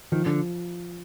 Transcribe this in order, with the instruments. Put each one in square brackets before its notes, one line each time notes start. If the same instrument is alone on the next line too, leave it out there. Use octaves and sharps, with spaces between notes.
[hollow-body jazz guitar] D#3 [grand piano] F3
[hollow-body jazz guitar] D3